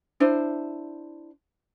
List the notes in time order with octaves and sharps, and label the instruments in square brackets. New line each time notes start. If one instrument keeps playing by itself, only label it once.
[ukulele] D4 E4 C5